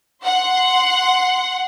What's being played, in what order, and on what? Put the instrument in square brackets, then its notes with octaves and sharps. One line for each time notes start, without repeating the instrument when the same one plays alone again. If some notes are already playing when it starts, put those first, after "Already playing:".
[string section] F#5 C6